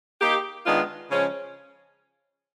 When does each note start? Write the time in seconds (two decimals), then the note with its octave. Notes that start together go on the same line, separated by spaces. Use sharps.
0.21 A#3 D#4 G4
0.65 D#3 G#3 B3 D4 F4
1.10 C#3 F3 G#3 C#4